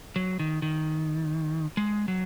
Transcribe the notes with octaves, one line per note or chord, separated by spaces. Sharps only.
F#3
D#3
D#3
G#3
F#3